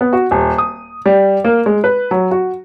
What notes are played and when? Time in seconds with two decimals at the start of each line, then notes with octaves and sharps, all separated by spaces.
0.01 B3
0.13 F#4
0.31 D#1
0.58 D#6
1.06 G3
1.44 A#3
1.66 G#3
1.84 B4
2.11 F#3
2.31 F#4